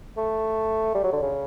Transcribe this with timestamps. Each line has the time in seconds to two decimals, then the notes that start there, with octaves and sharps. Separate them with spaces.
0.17 A3
0.95 G3
1.04 F#3
1.13 D3
1.22 C#3